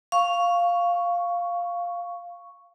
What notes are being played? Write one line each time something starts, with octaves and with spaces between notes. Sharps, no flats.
F5 C#6